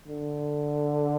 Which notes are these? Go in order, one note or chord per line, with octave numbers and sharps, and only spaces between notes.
D3